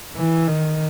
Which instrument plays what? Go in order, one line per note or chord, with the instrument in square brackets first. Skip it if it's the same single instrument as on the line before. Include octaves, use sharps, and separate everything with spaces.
[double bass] E3
D#3